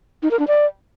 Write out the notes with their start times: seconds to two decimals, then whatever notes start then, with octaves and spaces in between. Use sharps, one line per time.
0.23 D#4
0.31 A#4
0.39 D4
0.48 D5